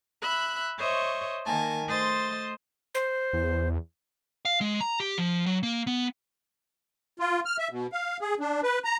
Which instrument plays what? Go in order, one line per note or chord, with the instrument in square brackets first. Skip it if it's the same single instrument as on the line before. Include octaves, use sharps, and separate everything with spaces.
[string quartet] E5 B5 F#6
C5 C#5 D#5 E5 C#6
D#3 A#3 G#5 A5
A3 C5 D#5 C6 A6
[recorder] C5
[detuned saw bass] E2
[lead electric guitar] F5
G#3
A#5
G4
F3
F#3
A#3
B3
[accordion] F4
F6
E5
B2
F5
G#4
D4
B4
A#5